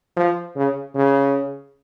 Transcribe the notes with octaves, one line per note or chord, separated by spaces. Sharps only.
F3
C#3
C#3